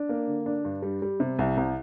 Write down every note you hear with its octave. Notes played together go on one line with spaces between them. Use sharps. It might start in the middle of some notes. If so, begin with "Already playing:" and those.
Already playing: D4
A#3
D3
D4
G2
G3
G3
C3
C2
C2